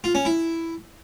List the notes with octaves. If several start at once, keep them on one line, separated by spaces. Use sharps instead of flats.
F4
C#4
E4